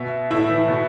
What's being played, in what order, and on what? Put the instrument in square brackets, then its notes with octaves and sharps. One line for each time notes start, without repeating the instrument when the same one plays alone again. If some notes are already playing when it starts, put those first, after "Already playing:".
Already playing: [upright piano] B2 E5
A2 E4 E5
E3
B2